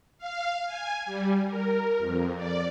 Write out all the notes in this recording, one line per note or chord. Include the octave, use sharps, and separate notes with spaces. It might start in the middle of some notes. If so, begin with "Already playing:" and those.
F5
G#5
G3
A#4
F2
D5